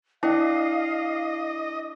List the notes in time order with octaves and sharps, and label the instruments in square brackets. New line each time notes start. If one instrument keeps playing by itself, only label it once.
[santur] D4 [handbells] E4 G5 [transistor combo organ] D#5 [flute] F5